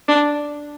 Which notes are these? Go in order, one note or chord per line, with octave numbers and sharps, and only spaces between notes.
D4